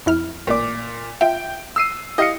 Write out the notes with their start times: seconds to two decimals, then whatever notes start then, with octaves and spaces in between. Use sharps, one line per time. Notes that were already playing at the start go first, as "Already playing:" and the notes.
0.06 F2 E4 F6
0.47 A1 A#2 D5 D6
1.21 F4 E5 G5
1.76 E6 C7 D#7
2.18 E4 G4 D#5 F5 C#7